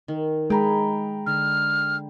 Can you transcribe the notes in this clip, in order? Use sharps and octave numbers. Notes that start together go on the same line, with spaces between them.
D#3
G#3 G#4 G5 A#5 B5
D3 F6